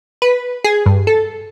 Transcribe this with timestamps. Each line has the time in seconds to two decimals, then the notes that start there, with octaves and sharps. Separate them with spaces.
0.22 B4
0.64 G#4
0.86 G2
1.07 A4